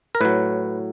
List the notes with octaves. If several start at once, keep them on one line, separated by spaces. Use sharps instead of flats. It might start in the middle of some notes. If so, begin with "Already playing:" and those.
A#4
A2 F#3 B4